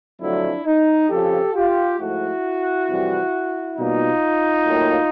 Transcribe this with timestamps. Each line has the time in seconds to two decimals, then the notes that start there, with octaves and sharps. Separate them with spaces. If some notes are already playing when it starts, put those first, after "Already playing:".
0.21 F2 D3 F#3 A3 D4 E4
0.66 D#4
1.10 F2 C#3 F3 G4 A4
1.55 F4 G4
1.99 G#2 F3 A3 E4 F#4
2.88 F2 C3 E3 G3
3.77 B2 G3 A#3 D#4 F4
4.67 A2 F#3 A#3